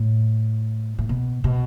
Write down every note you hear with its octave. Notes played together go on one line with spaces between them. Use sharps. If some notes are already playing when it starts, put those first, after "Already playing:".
Already playing: A2
A2
B2
B2